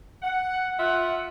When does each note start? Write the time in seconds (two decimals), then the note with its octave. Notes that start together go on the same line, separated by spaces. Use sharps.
0.23 F#5
0.79 F4 E5 F#5